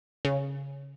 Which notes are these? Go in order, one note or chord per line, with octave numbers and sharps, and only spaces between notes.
C#3